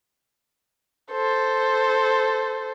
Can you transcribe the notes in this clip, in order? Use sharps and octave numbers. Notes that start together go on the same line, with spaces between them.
A4 C5